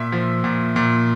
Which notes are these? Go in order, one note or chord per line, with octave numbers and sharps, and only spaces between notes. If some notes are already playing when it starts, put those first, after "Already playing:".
Already playing: A#2 E5
F3
A#2
A#2